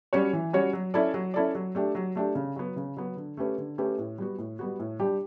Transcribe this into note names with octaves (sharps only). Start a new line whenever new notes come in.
G3 C#4 F#4 C#5
E3
G3 C#4 F#4 C#5
F#3
C#4 E4 A4 D5
F#3
C#4 E4 A4 D5
F#3
A3 D4 G4
F#3
A3 D4 G4
C#3
F#3 B3
C#3
F#3 B3
D3
A3 C#4 G4 B4
D3
A3 C#4 G4 B4
A2
G3 B3 F#4
A2
G3 B3 F#4
A2
G3 D4 G4